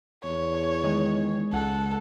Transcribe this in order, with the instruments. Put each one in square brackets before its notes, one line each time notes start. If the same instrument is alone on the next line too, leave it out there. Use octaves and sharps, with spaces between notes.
[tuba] E2 [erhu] C#5
[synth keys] D#3 [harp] G#3 G#4
[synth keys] C#2 F#5 [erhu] A4